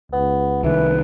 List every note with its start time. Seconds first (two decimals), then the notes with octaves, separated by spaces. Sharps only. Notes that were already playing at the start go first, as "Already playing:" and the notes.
0.12 C#2 B3
0.63 C2 D#3 E3 B4